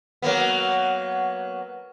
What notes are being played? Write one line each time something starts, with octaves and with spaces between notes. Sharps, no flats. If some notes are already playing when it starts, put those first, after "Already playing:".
F#3 A#3 B3